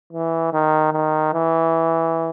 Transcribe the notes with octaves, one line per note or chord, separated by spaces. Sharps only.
E3
D#3
D#3
E3